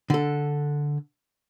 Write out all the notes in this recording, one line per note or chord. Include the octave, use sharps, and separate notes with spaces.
D3 A4